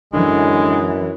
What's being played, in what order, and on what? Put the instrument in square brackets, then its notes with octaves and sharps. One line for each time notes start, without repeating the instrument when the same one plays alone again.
[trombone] F#2 [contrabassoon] D3 [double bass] E3 [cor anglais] G#3